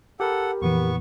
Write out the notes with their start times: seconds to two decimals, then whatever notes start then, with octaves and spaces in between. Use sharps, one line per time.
0.20 G4 A4 A#4 F#5 B5
0.62 F2 A#2 E3 B3 C#6